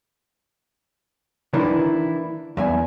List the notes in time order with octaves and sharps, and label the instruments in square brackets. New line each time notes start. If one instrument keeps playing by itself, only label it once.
[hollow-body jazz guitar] D#3 E3 A#3 D4 E4
E2 E5 G#5